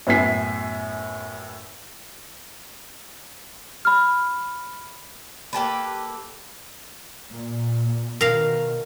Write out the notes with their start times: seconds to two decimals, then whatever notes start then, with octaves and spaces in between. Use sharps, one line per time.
0.07 F#2 A2 B3 G#5 B6 C7
3.85 B5 F6
5.53 A#3 G4 A4 B4
7.30 A#2
8.21 B2 D#3 A#4 F5